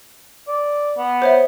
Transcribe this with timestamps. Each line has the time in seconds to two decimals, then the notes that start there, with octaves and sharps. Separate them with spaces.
0.48 D5
0.98 B3
1.22 C5 C#5 E5